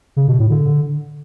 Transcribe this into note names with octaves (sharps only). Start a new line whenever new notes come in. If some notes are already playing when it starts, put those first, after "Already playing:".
C#3
B2
A2
D3